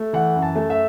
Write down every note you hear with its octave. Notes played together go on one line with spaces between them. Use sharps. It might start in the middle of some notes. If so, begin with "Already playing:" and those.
Already playing: A3
E3 F#5
F#2
A5
A3
E5